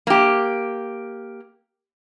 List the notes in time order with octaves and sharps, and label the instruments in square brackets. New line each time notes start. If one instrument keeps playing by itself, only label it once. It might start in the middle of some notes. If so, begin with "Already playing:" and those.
[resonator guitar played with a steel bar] A#3 G4